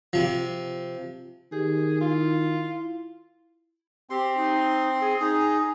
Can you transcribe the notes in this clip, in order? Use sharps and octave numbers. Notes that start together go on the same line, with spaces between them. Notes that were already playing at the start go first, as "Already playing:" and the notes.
C3 F3
D#3 G4 G#4
E4 F4
C4 G4 C6
D#4
G#4
D#4 G#4